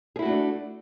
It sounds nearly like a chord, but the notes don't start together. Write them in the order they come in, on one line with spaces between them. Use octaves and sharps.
G#4 E4 F#4 A3 D4